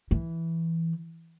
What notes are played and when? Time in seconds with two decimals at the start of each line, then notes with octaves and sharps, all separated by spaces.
0.11 E3